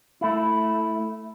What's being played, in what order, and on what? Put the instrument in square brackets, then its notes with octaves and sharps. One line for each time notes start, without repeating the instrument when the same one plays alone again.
[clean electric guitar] A3 E4